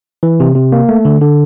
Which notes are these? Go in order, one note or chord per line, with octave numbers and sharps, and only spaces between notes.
E3
C3
C3
A#3
A3
D3
D3